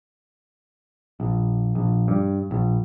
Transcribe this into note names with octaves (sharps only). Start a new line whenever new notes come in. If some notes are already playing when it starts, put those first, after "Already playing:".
A#1
A#1
G2
A#1